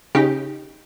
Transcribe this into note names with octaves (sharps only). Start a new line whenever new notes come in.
C#3 D#4 G4